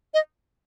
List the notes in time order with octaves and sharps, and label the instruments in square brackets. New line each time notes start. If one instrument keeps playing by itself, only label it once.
[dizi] D#5